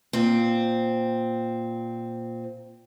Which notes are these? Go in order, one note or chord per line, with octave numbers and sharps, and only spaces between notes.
A#2 C4